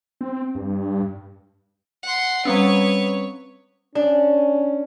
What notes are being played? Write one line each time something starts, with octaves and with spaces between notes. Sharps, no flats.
C4
G2
F#5 C6
G3 C4 C#4 B4 C#5
C#4 D4